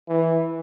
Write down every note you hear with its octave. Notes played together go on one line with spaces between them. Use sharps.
E3